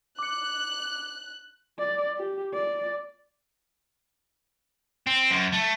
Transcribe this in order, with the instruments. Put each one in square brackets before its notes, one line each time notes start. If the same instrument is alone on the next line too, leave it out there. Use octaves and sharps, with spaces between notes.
[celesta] D6 C#7 [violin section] F#6
[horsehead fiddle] D5
G4
D5
[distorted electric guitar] C4
F#2
A3